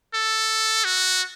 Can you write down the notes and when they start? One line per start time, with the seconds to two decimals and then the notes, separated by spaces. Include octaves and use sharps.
0.14 A4
0.85 F#4